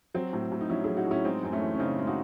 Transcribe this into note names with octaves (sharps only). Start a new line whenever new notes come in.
F#3 C4
A2
A2
D#4
F#3 C#4 E4
F#3 E4 G#4
D#4 F#4
A2 C#4 E4
G#3 C4 D#4
F#2 C4
A3 C#4
E3
C#4
C#3 C4 D#4
G#3
D#4 F#4